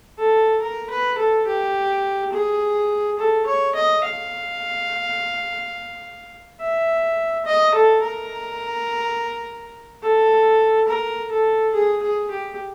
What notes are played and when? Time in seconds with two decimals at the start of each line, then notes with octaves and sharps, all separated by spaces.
0.18 A4
0.62 A#4
0.90 B4
1.18 A4
1.46 G4
2.32 G#4
3.19 A4
3.46 C#5
3.75 D#5
4.04 F5
6.60 E5
7.46 D#5
7.74 A4
8.02 A#4
10.02 A4
10.88 A#4
11.31 A4
11.74 G#4
12.02 G#4
12.31 G4